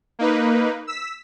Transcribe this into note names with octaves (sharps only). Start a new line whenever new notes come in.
A#3 D#4 B4
E6 B6